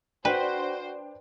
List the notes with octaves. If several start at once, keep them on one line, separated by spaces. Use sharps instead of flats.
D4 F#4 B4 C5 G5